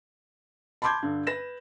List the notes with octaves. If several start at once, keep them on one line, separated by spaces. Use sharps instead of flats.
A5 B5 C6 D6 G6 G#6
G2 D3
B4 A#6 E7